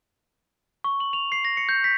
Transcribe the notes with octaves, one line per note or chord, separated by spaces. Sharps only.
C#6
F#7
F7
C7
A#6
C#7
G6
B6